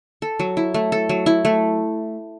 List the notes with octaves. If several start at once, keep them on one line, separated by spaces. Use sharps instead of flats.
A4
F#3
E4
A3
A4
F#3
E4
A3